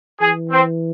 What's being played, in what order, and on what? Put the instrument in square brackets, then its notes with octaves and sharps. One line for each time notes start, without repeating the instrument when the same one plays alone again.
[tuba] E3 [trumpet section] G#4
[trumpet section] C4